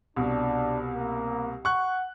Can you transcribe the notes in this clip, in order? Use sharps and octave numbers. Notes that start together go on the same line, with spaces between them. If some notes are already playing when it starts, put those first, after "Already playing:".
C2 B2 D4
A#3
F#5 C#6 F#6